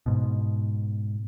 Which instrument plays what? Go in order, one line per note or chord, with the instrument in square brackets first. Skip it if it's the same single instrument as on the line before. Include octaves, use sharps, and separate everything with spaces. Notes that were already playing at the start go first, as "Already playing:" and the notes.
[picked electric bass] G#2 B2